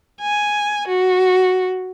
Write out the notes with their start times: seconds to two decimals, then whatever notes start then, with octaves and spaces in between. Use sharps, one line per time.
0.21 G#5
0.88 F#4